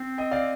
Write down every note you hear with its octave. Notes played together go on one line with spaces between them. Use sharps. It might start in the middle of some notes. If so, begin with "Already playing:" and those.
Already playing: C4
D#5 G5
D5 F5